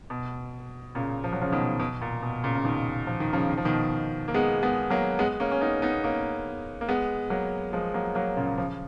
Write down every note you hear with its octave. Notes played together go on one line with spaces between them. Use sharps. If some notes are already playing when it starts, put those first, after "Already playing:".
B2
A#2 C#3
F3
F#3
C#3 F3
B2 D#3
B2
A#2
B2
A#2 C#3
C#3
B2 D#3
F3
D#3
C#3 F3
D#3
F3
B2 D#3
A#3
G#3 B3
G#3 B3
F#3 A#3
G#3 B3
A#3 C#4
C#4
B3 D#4
B3 D#4
A#3 C#4
A#3
G#3 B3
F#3 A#3
F3 G#3
F#3 A#3
F#3 A#3
A#2 C#3
C#3 F3